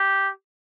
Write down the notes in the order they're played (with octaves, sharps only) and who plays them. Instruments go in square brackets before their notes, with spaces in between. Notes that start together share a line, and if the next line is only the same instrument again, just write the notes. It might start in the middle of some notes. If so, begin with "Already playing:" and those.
Already playing: [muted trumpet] G4